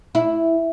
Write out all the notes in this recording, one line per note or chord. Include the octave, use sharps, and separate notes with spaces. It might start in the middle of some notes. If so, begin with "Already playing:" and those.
E4